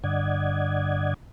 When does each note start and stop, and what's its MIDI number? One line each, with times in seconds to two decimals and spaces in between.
0.04 1.14 43
0.04 1.14 50
0.04 1.14 74
0.04 1.14 75
0.04 1.14 78
0.04 1.14 92